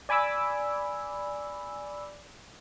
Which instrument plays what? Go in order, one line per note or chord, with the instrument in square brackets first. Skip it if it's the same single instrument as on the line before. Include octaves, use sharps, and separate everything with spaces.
[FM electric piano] D5 G#5 B5 D6 E6